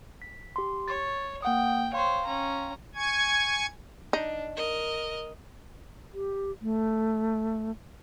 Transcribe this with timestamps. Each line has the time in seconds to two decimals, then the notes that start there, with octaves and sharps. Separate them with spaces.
0.22 B6
0.56 G4 C6
0.88 C#5 C#6 A6
1.42 A#3 F#5 G5 D#6
1.93 C5 C#5 F5 G5 C6
2.25 C#4 A#5
2.95 G#5 C#6 G#6
4.13 D4 D#4
4.57 A#4 D#5
6.13 G4
6.62 A3